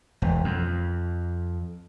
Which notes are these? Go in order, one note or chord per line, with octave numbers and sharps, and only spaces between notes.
E1
F2